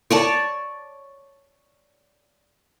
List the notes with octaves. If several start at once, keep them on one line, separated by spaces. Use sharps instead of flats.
C#5 D5 A5